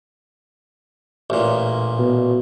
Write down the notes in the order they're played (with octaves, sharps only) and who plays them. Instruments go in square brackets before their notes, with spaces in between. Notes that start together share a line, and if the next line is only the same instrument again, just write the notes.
[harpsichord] A1 A#2
[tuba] B2